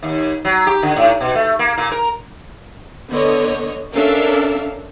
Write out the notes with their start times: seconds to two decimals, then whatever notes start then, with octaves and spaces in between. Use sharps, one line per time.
0.03 D#2
0.45 F#3
0.67 G4
0.83 D3
0.96 A2
1.20 B2
1.35 A3
1.59 A#3
1.78 A#2
1.92 A#4
3.10 D3 B3 C#5 D#5
3.93 C#4 D4 A4 A#4 E5 F5